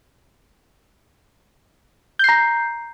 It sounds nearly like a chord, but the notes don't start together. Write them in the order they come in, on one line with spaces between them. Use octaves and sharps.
G6 C7 A#5